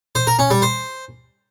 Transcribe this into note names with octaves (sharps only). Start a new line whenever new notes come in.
C5
A#4
C#4
G3
C5